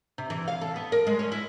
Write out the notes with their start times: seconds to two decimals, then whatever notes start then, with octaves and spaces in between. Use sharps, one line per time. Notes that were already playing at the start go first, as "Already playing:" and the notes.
0.18 C3
0.30 E3
0.48 F5
0.61 A4
0.76 B3
0.92 A#4
1.07 G#3
1.19 C#4
1.32 E4